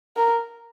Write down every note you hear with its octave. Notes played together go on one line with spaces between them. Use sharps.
A#4